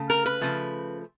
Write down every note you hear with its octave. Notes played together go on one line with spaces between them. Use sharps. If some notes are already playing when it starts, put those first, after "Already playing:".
Already playing: C#3 A3
A#4
B4
C#3 F3 A3